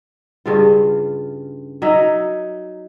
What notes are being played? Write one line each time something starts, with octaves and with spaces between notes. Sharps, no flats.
G2 C#3 F4
F#3 D#4 D#5 E5